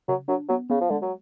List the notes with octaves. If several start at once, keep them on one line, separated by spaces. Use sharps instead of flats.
C#3 F#3
F#3 D4
F#3 B3
C#3 B3
F3
D3 G#3
F#3